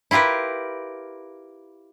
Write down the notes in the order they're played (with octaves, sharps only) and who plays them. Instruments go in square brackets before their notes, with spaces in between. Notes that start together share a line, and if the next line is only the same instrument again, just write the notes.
[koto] E4 F4 G4 A#4 B4